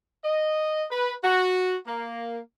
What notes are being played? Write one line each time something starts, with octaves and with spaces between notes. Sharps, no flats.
D#5
B4
F#4
A#3